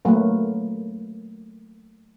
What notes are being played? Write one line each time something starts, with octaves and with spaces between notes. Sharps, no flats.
F#3 A3 A#3 B4